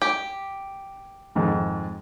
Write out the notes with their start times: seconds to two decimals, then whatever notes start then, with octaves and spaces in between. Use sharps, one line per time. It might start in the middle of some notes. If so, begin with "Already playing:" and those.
0.02 G4
1.35 F2 G#2 D#3